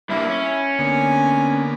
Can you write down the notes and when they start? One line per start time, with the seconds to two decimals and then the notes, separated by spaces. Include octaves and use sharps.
0.10 G2 A#3 E4
0.29 C#4
0.79 D3 A#3 B3 G#5